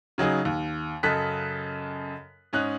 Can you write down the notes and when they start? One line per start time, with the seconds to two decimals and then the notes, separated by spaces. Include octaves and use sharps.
0.18 C#3 F#3 D#4 G#4
0.45 D#2
1.03 F#2 C#3 A4 D#5 F#6 B6
2.53 G#2 C#4 D#4 F#6